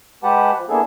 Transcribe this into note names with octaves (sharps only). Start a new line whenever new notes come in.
G#3 G4 B4 F#5 A5
F3
A#3 B3 D4 E4 G#4 A4